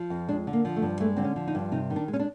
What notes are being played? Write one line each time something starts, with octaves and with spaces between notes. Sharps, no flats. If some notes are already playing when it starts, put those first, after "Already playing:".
Already playing: F3
F2
G#3 D4
D3
A#3
F3
A3
G2
G#3 A3
D3 C4
C#4
F3
D#4
G2
C3 D#4
D#3
D4
G#3
C#4
D4